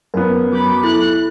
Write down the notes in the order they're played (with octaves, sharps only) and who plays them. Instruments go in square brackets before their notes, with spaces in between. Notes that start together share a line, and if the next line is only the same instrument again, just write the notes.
[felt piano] F#2 B3 [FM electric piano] A#4
[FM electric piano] F#3 G6 [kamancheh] B5 D6
[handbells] E4 [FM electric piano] A4 [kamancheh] F#6